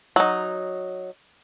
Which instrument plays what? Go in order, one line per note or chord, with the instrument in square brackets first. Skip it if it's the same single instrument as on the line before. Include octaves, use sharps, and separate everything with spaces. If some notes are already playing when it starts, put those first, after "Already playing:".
[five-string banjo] F#3 D#4